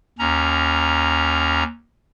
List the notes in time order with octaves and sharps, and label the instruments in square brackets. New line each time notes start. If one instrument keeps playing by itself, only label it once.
[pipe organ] D#2 C#4 A#5